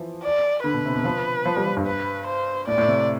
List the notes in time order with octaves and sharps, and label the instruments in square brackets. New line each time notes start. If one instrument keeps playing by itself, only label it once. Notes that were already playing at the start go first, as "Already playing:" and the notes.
Already playing: [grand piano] E3 F3
[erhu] D5
[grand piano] D3 [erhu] B4
[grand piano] B2
C3
B2
F3
F3
G3
F3
G2
[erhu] B4
C5
[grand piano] A2 [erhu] D5
[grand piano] A2
C3